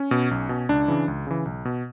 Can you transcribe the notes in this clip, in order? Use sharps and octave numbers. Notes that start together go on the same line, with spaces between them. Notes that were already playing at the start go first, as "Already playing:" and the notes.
Already playing: C#4
B2
B1
B2
C#2 D4
C#3 E3
C#2
C#3 E3
B1
B2